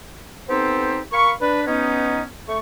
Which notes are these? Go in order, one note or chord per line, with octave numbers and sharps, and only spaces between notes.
B3 C4 D#4 G4 A4 C5
A#4 F5 B5 C#6
D4 B4
B3 C#4 D#4
A3 C#6